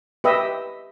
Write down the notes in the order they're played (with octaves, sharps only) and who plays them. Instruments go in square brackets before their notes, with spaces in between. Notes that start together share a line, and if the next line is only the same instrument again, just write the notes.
[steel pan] G4 B4 D#5 E5